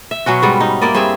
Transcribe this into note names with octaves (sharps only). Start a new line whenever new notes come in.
E5
B2 F#3 C#4 F#4
G#2 G3 B3
D#4
A#3 E4 D5 D#5
G2 C4 G#4 E5